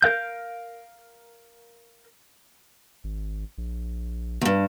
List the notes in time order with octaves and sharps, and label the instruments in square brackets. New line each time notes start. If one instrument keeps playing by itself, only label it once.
[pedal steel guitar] A#4 F5 G6
[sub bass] G#1
A#1
[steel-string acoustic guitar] E2 G2